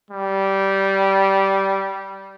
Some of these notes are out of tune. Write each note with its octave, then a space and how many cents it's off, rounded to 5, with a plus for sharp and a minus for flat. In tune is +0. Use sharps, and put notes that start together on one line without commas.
G3 -15